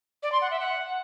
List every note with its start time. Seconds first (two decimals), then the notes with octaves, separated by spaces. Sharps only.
0.23 D5
0.32 C6
0.41 F#5
0.51 E5
0.60 F#5